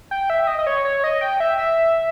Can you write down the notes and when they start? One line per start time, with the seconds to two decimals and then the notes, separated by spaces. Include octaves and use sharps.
0.11 G5
0.30 E5
0.47 D#5
0.59 D#5
0.67 C#5
0.85 C#5
1.04 D#5
1.21 G5
1.40 E5
1.58 E5